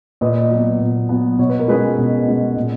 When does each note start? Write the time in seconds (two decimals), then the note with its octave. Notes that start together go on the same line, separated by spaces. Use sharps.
0.21 A#2 B4 D#5
0.51 F#3 B3
0.80 A#2
1.09 F#3 B3
1.39 B2 C#5
1.49 B4
1.59 A#4
1.68 G#3 C#4 G#4 B4
1.98 B2
2.27 G#3 C#4
2.57 A#2